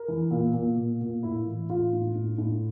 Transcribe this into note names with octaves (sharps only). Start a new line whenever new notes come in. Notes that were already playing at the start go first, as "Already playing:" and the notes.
Already playing: A#4
E3
A#2
A#2
A#2
A#2
A2 E4
E3
A2 F4
A2
A2
A2